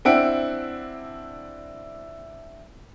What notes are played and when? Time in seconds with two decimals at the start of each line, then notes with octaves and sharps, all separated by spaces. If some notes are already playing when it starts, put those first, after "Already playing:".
0.05 C4 D4 E4 F#5 D7